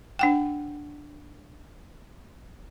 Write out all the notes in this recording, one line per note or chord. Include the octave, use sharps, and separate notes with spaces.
D4 F#5 G5